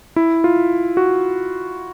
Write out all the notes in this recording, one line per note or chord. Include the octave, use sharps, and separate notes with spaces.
E4
F4
F#4